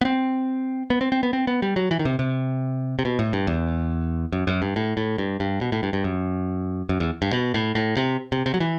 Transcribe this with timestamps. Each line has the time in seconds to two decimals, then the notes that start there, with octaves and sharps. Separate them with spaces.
0.01 B3
0.05 C4
0.90 B3
1.01 C4
1.12 C4
1.23 B3
1.33 C4
1.47 B3
1.62 G3
1.76 F#3
1.91 E3
1.99 D#3
2.05 C3
2.19 C3
2.99 C3
3.05 B2
3.19 A2
3.33 G2
3.47 E2
4.32 F#2
4.47 F#2
4.62 G2
4.76 A2
4.97 A2
5.18 G2
5.40 G2
5.61 B2
5.72 A2
5.83 G2
5.93 G2
6.04 F#2
6.89 F#2
7.00 E2
7.22 G2
7.33 B2
7.54 A2
7.75 A2
7.97 C3
8.32 C3
8.46 C3
8.54 F#3
8.60 E3